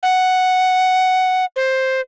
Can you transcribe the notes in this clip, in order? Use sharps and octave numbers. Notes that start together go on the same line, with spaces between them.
F#5
C5